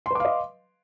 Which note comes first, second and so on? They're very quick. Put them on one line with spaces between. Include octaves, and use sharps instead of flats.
C6 B4 D6 F5 D#5